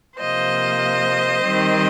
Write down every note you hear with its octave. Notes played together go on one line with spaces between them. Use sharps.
C3 F3 A#3 C5 D#5
D#3 G3 C4